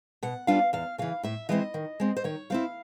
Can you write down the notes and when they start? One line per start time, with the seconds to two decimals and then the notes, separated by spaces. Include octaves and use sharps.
0.23 B2 F#5
0.47 G3 B3 D4 F4 F5
0.73 E2 F5
0.98 C#3 E3 F5
1.23 A2 E5
1.49 E3 G#3 C4 E4 D#5
1.74 D#3
2.00 G#3 C4
2.17 C5
2.24 D#3 C#5
2.50 G3 C4 E4 F5